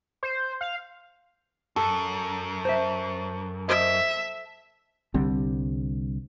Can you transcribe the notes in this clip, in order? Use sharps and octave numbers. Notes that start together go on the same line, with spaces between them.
C5
F5
F#2 A4
C5 E5
C5 D#5 E5
C2 D3 G3 C4